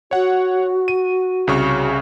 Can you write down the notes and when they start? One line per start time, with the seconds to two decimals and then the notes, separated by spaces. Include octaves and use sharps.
0.11 F#4 C#5 F#5
0.88 D#7
1.47 C2 C#3 C#6